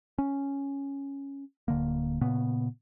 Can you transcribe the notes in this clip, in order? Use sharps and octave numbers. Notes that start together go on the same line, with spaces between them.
C#4
D1 D3 A#3
A#2 C#3 B3